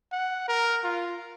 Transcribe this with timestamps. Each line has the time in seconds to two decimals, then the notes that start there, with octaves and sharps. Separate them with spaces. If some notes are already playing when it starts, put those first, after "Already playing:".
0.11 F#5
0.48 A#4
0.84 F4